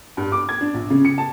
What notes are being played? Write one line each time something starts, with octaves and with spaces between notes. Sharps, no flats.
G2
D6
G#6
D4
A#1
C#3
C#7
A5